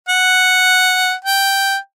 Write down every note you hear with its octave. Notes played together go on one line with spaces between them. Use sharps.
F#5
G5